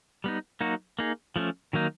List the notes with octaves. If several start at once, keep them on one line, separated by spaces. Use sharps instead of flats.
G3 B3 D#4
F#3 A#3 D#4 F#4
A#3 D#4 G#4
F3 A3 C#4
D#3 F#3 A#3 D#4